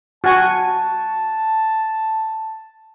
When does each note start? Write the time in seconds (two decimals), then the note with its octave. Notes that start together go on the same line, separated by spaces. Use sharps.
0.24 F#4 G#5 A5